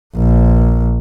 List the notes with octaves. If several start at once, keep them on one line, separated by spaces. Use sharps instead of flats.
A#1